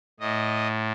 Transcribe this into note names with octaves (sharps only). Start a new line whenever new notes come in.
A2 D#5